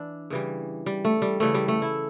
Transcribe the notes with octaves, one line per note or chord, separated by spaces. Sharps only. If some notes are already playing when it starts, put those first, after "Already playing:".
Already playing: E3 D4 E4
C#3 E3 G3
G3
A3
G3
C#3 E3 G3 A3
G3
A3
E4